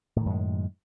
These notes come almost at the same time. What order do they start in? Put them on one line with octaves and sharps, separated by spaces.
A2 D#3 F#2 G#3